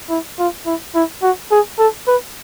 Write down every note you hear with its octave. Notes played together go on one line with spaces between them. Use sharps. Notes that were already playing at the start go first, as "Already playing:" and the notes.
E4
F4
E4
E4
F#4
G#4
A4
B4